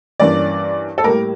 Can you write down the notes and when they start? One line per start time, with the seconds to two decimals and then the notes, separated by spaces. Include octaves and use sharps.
0.20 G2 E3 A#3 C#4 D5
0.98 A4
1.04 A2 G3 A#3 A#4